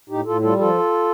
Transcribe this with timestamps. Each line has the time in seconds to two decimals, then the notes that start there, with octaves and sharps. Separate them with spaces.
0.09 A2 D#4 G4
0.26 A2 F4 A4
0.42 G3 F4 A4
0.58 F3 F4 A4